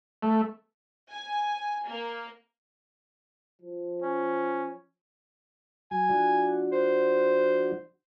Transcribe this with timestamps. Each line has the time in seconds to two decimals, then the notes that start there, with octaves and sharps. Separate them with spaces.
0.23 A3
1.12 G#5
1.87 A#3
3.62 F3
4.02 C#4
5.91 F#3 G#5
6.09 F3 D4 F#4
6.72 C5